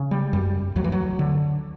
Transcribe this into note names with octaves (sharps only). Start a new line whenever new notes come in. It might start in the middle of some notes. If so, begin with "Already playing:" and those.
Already playing: C#3
G3
F#2 G3
D2 F#3
E3
F#3
D3